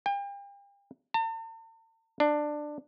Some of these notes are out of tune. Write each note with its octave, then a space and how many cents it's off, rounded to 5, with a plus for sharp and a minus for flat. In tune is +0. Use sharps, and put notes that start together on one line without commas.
G5 +40
A5 +45
D4 +15